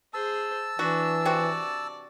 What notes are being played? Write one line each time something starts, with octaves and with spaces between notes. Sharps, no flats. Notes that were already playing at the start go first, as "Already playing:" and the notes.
G#4 C5 A5 E6
E3 D4 F#4
C3 C4 F#4 D5